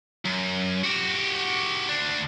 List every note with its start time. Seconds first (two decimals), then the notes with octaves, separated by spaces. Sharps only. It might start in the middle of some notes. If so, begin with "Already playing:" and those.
0.25 F#2
0.84 F#4 G4
1.89 D2 D4